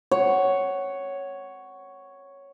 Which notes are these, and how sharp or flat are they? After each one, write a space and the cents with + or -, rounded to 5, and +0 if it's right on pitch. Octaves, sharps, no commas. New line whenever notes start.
C#5 +0 F#5 +15